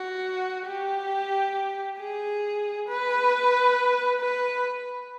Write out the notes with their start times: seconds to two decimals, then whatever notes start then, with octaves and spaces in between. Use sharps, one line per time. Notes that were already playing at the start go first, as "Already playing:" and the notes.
Already playing: F#4
0.66 G4
1.99 G#4
2.88 B4
4.21 B4